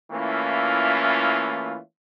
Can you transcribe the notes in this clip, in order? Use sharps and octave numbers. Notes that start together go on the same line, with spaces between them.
E3 A3 A#3 C#4 E4 F4